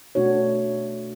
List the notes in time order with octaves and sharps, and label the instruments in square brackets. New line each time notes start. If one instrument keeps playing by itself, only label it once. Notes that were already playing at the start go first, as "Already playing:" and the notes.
[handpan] B2 A3 D4 F#4 C#5